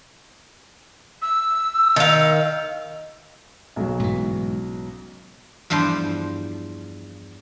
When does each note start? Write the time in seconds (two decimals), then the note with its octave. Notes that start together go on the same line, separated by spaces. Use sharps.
1.22 E6
1.96 D#3 F5
3.76 B1 C#3 F#3
4.00 G#2 E3
5.70 E2 G2 F3 G4 C5